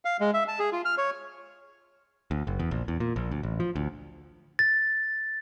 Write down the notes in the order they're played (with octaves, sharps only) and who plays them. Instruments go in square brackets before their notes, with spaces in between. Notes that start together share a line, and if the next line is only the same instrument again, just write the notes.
[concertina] F5
G#3
E5
A5
G#4
F4
F6
C#5
[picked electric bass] D2
F#1
E2
A#1
E2
A#2
A#1
D2
A1
F3
D2
[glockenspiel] A6